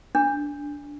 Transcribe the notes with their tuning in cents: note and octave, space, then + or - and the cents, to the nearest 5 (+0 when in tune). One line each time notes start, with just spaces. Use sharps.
D4 -10